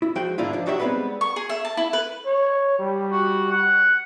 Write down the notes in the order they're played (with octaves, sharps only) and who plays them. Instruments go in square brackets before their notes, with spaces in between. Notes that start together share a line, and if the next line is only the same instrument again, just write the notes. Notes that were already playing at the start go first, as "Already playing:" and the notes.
[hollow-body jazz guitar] E4
F3 G#3 F#4 G5
G#2 D3 A#3 D4 E4 F4
F3 D4
F#3 D#4 F#4 G4 A4 E5
G3 G#3 B3 C4 B4
[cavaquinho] C#6
G#4
E5
A5
E4
B4
[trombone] C#5
G3
[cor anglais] F#4
F#5